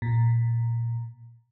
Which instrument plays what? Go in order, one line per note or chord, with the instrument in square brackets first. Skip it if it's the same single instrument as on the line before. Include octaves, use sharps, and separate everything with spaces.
[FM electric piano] A#2